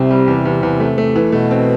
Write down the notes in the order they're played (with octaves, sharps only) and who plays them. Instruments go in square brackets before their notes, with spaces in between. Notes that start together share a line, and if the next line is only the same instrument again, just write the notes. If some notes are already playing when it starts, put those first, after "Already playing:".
Already playing: [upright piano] C2 C4 [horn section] C3
[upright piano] G3
E2
E2
E2
A3
A3
E3
[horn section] B2 [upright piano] A3
[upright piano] C4